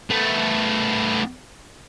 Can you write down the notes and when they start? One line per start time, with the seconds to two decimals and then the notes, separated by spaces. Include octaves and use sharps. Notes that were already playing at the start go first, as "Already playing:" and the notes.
0.10 A3 B3